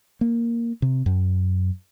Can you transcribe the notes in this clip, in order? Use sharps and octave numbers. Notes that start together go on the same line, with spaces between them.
A#3
C3
F#2